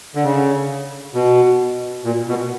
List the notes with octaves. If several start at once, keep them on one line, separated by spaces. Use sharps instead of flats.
D3
C#3
B2
A#2
B2